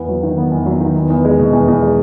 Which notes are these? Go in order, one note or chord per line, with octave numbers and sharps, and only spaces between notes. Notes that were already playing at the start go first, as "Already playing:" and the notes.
Already playing: E2 B3
F#3
D#3
B3
E2
F#3
D#3
E2
E2
G#3
B2
E2
E2
G#3